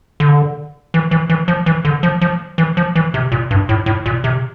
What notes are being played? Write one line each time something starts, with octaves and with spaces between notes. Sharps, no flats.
D3
E3
E3
E3
F3
E3
D3
F3
F3
E3
F3
E3
C3
A#2
G2
A2
A2
A#2
C3